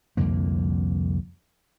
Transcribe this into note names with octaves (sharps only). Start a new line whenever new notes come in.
C2 F2 D3 A#3